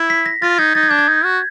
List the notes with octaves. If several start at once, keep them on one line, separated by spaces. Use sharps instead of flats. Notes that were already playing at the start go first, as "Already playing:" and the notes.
Already playing: E4
B6
A#6
F4 A6
D#4 G#6
D#4 A6
G#6
D4 G6
G#6
D#4
F#4